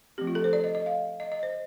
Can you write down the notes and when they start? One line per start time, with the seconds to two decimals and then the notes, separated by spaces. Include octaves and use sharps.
0.18 F3 A3 C4 G4
0.27 F4
0.35 A4
0.44 C5
0.53 D5
0.64 D#5
0.75 D#5
0.86 F5
1.20 D#5
1.32 D#5
1.43 C5